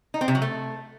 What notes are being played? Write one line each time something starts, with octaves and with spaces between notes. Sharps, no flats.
D#4
C4
C3
F#3
A3